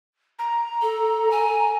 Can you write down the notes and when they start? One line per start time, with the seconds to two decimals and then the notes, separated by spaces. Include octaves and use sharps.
0.39 A#5
0.82 A4
1.31 G#5